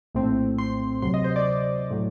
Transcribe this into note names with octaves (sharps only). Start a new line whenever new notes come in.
A#1 A2 A3 C4
C6
D2 C3 F#3 C6
D#5
C5
D5
A2 F#3